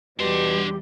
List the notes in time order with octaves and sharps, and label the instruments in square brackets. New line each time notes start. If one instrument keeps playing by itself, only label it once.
[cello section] E2 G3 [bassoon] B2 [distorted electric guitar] D4 C6 [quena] G4